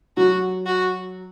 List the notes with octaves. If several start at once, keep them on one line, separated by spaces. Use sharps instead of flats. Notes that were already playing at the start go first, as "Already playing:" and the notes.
F#3 F#4
F#4